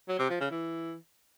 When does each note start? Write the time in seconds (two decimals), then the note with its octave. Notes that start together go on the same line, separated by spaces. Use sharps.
0.09 F#3
0.19 C3
0.30 F3
0.40 C#3
0.51 E3